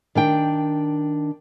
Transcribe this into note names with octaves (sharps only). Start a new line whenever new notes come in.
D#3 D4 G5